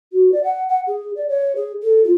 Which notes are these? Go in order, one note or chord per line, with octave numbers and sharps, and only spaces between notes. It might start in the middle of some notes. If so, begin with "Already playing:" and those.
F#4
D5
F#5
F#5
G#4
D5
C#5
G#4
A4
F4